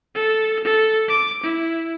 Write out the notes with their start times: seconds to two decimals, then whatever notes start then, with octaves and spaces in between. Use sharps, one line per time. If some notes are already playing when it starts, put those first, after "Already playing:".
0.15 A4
0.64 A4
1.08 D6
1.43 E4